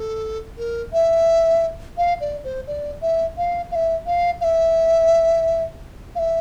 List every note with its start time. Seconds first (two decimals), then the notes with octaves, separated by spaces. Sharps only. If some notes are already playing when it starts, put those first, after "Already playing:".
Already playing: A4
0.57 A#4
0.93 E5
1.97 F5
2.21 D5
2.44 C5
2.67 D5
3.01 E5
3.37 F5
3.71 F5
3.75 E5
4.06 F5
4.41 F5
4.44 E5
6.15 F5
6.19 E5